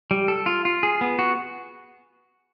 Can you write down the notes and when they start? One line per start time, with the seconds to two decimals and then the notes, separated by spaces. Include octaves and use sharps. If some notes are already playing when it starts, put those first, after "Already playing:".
0.11 G3
0.28 A4
0.46 F4
0.65 F4
0.83 G#4
1.01 B3
1.19 F#4